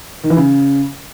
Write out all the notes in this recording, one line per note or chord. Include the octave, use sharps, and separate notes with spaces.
D#3
E3
C#3